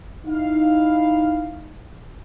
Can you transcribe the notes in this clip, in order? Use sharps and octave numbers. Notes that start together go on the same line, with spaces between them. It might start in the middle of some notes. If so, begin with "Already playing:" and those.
D#4 E4 F5